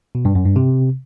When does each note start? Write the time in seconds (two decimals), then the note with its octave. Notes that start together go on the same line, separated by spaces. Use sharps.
0.15 B2
0.25 G2
0.35 F#2
0.46 G2
0.56 C3